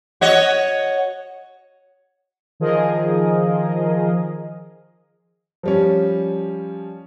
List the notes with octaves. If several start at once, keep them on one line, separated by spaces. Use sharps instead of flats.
F#4 C#5 D#5
D#3 F3 G#4 A#4 D#5
F3 G3 C#4